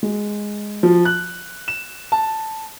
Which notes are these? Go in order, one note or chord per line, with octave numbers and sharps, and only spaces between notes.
G#3
F3
F#6
E7
A5